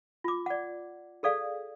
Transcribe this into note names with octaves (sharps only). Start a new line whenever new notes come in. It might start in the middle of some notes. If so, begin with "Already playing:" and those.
F4 D6
D5 F#5
G#4 A4 D5 F5